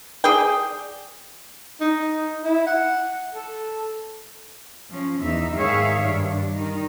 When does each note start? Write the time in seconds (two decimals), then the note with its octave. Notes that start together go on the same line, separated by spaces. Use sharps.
0.24 G#4 D5 G5
1.81 D#4
2.44 E4
2.67 F#5
3.35 A4
4.89 F3 C#4
5.22 E2 D#4 E5
5.54 G#2 D#3 G#4 C#5 E5 F5
6.02 G2 D4
6.55 D#3 D#4